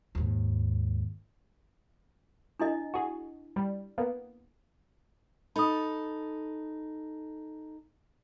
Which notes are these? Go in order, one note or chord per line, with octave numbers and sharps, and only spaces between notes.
D#2 G#2
D4 E4 D#5
F#4 G#4
G3
A#3 B3
D#4 A4 B5 D#6